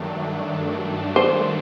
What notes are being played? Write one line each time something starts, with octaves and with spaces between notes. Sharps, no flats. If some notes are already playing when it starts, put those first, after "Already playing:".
Already playing: G2 D#3 F#3 A3 D4
C5